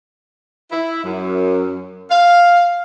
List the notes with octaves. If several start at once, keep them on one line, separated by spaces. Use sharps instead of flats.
E4
F#2
F5